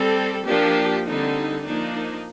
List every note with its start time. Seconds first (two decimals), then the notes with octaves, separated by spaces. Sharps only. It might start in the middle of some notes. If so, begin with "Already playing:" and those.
Already playing: G3 C4 A4
0.45 F3 A#3 D4 G4
1.05 D3 G3 C4 D#4
1.64 F3 A#3 D4 D#4